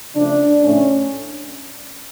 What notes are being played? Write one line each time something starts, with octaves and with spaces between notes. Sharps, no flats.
C#3 F3 A3 D4
A2 F3 A3 C#4